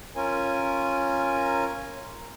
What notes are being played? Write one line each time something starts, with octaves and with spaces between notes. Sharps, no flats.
C#4 F4 A#4 G#5